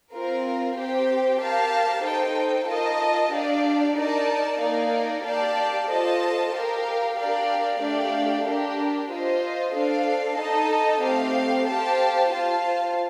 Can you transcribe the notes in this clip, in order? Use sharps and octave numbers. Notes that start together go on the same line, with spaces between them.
C4 F4 A#4
C4 G4 C5 G5
G4 A#4 F5 A5
D#4 A4 C5 G5
F4 A#4 D#5 A5
D4 G4 D5 F5
D#4 A#4 D5 A5
A#3 D#4 A#4 D5 F5
G4 D5 F5 A5
F4 A4 C5 D#5 A5
G4 A#4 F5
D4 G4 A#4 D5 F5
A3 D4 G4 D5 F5
D4 G4 A#4
F4 C5 D#5
D4 A4 C5 F5
D#4 A4 D#5 A5
A3 C4 G4 C5 F5
G4 C5 F5 A5
F4 C5 F5 A5